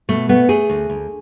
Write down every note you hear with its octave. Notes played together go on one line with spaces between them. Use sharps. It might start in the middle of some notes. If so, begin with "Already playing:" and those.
B2 A3
A3 B3
A3 G#4
D2
D2